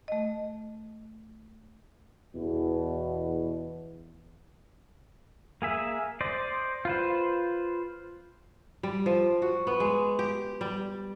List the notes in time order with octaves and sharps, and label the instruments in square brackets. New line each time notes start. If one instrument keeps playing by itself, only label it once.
[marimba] A3 D#5
[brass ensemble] E2 B2
[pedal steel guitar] A#3 G#4 E5
C5 D5 D#5
F4 B4 C5
[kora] G3
F3
F#4
B3
G#3
G4
G3